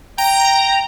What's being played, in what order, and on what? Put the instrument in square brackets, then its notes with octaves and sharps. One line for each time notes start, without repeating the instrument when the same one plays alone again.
[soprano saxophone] G5 [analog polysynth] A#5